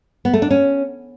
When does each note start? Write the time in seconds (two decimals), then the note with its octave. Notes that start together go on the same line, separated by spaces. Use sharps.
0.25 B3
0.33 A3
0.42 D4
0.51 C#4